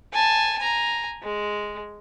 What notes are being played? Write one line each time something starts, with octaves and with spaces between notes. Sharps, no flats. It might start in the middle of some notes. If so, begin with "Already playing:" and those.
G#5 A5
G#5 A#5
G#3